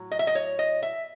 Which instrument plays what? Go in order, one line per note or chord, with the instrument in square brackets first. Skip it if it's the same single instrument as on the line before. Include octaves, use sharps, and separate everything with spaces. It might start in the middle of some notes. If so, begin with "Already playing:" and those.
Already playing: [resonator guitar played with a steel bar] A2 F#3
D#5
E5
D#5
C#5
D#5
E5